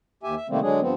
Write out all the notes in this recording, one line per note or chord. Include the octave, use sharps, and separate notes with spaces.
D#2 G4 E5 G#5
E5
C3 D#3 G3 A3 A#3 C4
D3 F#3 G#3 D4 G#4
G2 F3 B3 C4